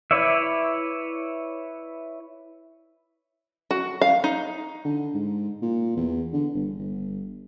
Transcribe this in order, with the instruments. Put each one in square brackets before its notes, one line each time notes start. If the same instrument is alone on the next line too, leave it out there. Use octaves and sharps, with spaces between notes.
[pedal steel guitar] E4 B4 C#5 D5 E5
[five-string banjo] F#4
F5
D#4
[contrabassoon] D3
G#2
A#2
E2
D3
G1
G1